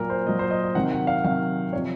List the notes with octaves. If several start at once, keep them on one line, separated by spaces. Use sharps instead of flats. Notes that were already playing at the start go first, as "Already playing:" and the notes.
Already playing: A#2 F#3 A#4
C5
A#2 F#3 D#5
C5
D#5
D#5
C3 D#3 F#3 F#5
F#5
F5
C3 D#3 F#3 F5
C3 F3 C#5